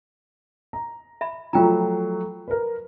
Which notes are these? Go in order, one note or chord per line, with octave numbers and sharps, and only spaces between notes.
A#5
E5 B5
F3 F#3 A3 F4 G5 A#5
A#4 B4